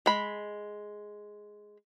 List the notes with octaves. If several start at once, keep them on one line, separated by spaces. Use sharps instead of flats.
G#3 B5